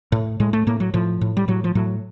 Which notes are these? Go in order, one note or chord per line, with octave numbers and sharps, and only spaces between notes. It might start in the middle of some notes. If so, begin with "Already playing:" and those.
A2
A2 G#3
A3
A2 A#3
F#3
A2 F3
A2
G3
A2 F#3
F3
A2 F#3